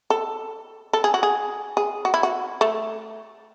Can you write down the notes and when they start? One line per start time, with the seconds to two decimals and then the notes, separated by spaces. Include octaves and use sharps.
0.10 A4
0.93 A4
1.04 G#4
1.14 F#4
1.23 G#4
1.77 G#4
2.05 F#4
2.14 E4
2.23 F#4
2.61 A3